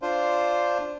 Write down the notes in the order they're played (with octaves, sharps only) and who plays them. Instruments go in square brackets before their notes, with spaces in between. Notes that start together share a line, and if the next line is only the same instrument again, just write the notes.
[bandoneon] D4 F4 C5